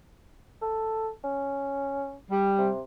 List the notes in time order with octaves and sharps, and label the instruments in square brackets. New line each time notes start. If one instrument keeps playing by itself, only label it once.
[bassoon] A4
C#4
[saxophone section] G3
[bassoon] C3